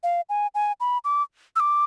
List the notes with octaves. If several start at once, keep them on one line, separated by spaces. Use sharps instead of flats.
F5
G#5
G#5
B5
D6
E6
D6